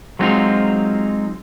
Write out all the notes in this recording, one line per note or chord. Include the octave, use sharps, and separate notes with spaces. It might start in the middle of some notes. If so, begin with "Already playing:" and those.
F#3 G#3 B3 C4 D#4 F4